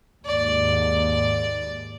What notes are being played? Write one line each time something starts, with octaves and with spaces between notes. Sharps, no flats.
D#2 G#2 D5